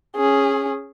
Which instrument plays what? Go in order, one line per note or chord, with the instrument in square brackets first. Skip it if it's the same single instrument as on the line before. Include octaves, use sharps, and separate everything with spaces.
[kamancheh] C#4 G#4